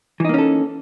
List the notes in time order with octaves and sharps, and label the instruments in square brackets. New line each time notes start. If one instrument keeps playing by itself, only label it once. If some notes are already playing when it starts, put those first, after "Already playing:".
[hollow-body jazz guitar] E3
D#4
A#3
C#4
A4